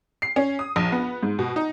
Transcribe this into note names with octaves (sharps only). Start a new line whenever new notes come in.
C7
C#4
D#6
A#1
B3
G#2
B2
D#4